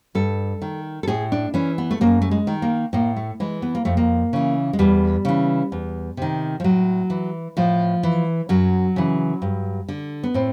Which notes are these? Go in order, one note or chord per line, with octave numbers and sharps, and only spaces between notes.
G2 A4
D#3
A4
A2 G#4
D4
E3 C#4
B3
A3
F#2 A#3
A3
G#3
D#3
A#3
A2 A#3
A3
E3 G#3
B3
A#3
F2 A3
A#3
C#3 E3
G#3
E2 G3
C#3 E3
E2
C3 D#3
F3
A2 F#3
E3
A2 F3
E3
F#2 F#3
C#3 E3
G2
D3
B3
A2 C4